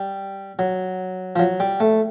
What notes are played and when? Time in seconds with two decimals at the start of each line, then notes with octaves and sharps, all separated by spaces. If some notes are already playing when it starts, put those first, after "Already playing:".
Already playing: G3
0.59 F#3
1.36 F3
1.39 F#3
1.60 G3
1.80 A3